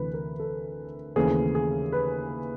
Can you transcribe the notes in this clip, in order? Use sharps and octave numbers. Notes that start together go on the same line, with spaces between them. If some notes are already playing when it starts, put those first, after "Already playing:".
Already playing: D2 C3 E3 B4
A#4
A4
D#2 C#3 E3 A3 C4 G#4
G#4
B4